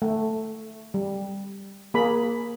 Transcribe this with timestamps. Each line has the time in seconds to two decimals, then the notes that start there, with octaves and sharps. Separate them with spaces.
0.02 A3
0.94 G3
1.94 A#3 G#4 B5